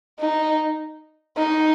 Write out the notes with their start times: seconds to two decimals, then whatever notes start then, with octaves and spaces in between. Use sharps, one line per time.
0.20 D#4
1.37 D#4